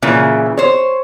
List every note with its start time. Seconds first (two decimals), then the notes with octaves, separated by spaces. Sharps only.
0.02 A#2 C#3 E3
0.58 C5 C#5